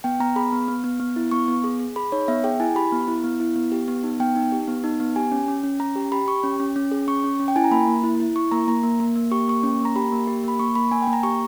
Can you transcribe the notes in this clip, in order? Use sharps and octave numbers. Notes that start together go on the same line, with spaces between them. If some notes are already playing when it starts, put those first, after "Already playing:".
B3 G5
B3 A#5
G#4 B5
B3
B3
B3
B3
E4
B3 C#6
B3
G#4
G#4
G#4 B5
D#4 C#5
B3 E5
G#4 G5
E4 G#5
G4 B5
B3
E4
B3
E4
B3
G4
B3
D#4
B3 G5
D#4
G4
B3
D#4
B3
G4 G#5
C#4
C#4
C#4
C#4 A#5
G4
G4 B5
G4 C#6
C#4
C#4
C#4
G#4
C#4 C#6
C#4
C#4
G5
E4 G#5
A#5
A#3 B5
A#3
E4
E4
E4 C#6
A#3 A#5
A#3 A#5
A#3
A#3
A#3
G4 C#6
A#3 C#6
C#4
A#3
A#5
G4 B5
A#3
G4
A#3 B5
A#3 C#6
A#3 B5
A#3 G#5
G5
A#3
A#5
G4 C#6